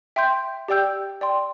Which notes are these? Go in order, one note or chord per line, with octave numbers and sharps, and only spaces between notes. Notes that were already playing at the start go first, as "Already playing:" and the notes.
E5 G5 C6 G6
G4 D5 G5 E6 G6
D5 G5 C6